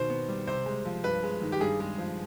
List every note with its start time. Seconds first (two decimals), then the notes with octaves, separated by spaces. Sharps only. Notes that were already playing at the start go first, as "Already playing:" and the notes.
Already playing: B2 D#3 C5
0.10 B3
0.28 G3
0.47 C3 C5
0.66 G#3
0.85 F3
1.04 G2 B4
1.23 G#3
1.41 D#3
1.52 G4
1.61 G2 G#4
1.80 G#3
1.98 F3